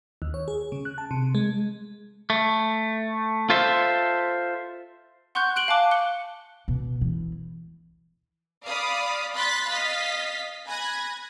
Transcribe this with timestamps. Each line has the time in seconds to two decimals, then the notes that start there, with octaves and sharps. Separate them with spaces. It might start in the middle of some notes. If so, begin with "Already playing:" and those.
0.22 D#2
0.34 C#5
0.48 G#4
0.72 C#3
0.85 F#6
0.98 A5
1.11 C3
1.35 G#3
2.30 A3
3.50 F4 A4 C5 E5
5.35 F#5 C6 C#6 F#6 G6
5.56 F#6 D7 F#7 G7
5.68 F5 G#5 A5 D6 F#6
5.91 F#6 C#7 G7
6.68 B2
7.01 E3
8.65 D5 F5 B5 D#6
9.33 B5 C6 F#6 A6 B6
9.67 D#5 F5 A6 B6
10.65 G#5 B5 F#6 G#6 A#6